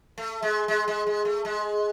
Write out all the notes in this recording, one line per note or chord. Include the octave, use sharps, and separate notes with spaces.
A3
G#3
G#3
G#3
G#3
A3
G#3